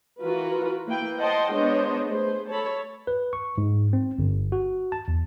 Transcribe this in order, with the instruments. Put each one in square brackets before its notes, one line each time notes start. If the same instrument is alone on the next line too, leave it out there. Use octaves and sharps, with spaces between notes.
[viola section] E3 F4 F#4 A#4 B4
A#3 E4 B4 G5
C5 D#5 F#5 G5 A5 C6
G#3 B3 D4 C5 C#5 D#5
A3 G#4 B4 C5
A4 C#5 A5 B5
[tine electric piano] B4
C#6
G#2
C4
G1
F#4
A5
E2